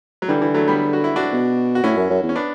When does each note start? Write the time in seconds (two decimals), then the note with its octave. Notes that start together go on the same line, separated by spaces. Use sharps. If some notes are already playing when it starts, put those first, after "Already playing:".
0.22 F#3
0.28 D3 E3 G3
0.42 E3
0.54 F#3 A3
0.68 G3 B3
0.93 F#4
1.04 E4
1.16 D4 F#4
1.32 B2
1.75 F#4
1.83 A2 C#4 E4
1.97 F#2
2.10 F#2
2.23 E2
2.29 C#4
2.36 B3 D4